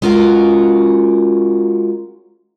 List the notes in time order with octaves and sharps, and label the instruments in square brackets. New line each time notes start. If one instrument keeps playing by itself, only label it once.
[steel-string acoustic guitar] G#3 C#4 F4 F#4 A#4